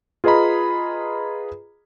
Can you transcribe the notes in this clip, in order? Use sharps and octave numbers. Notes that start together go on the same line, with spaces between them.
F4 G#4 B4 D#5 A#5 B5